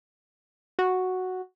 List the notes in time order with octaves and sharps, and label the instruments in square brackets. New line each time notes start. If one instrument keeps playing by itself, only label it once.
[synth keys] F#4